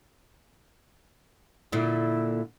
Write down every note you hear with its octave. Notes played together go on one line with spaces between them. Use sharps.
A#2 D3 E4